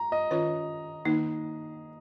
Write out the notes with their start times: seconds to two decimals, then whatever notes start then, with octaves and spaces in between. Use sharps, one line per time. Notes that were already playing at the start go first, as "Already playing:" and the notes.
Already playing: A#5
0.12 D#5
0.31 D#3 C#4 F4 C#5
1.05 D#3 A#3 D#4